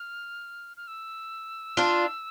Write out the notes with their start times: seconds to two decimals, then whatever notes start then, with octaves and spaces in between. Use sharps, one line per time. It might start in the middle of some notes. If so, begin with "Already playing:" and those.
Already playing: F6
0.77 F6
0.88 E6
1.77 D4 F4